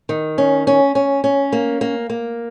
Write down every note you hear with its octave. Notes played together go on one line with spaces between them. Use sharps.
D#3
C#4
C#4
C#4
C#4
A#3
A#3
A#3